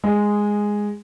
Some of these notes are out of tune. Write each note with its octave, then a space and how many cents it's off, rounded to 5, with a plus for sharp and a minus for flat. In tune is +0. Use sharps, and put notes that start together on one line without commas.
G#3 -5